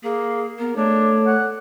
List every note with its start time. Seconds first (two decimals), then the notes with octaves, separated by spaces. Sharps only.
0.04 A#3 G#4
0.59 B3 A#4
0.76 A3 D4 C#5
1.26 F#5